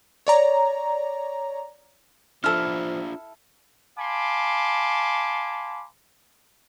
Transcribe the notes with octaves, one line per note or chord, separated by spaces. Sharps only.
C#5 D5 A#5
F3 D4 E4 F4 A4 F6
F5 G#5 A5 B5 C6 D6